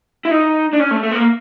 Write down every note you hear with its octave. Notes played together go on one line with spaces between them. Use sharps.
E4
D#4
D4
C#4
A3
A3
B3
A#3